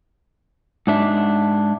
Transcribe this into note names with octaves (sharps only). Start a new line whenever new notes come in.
G#2 D4 E5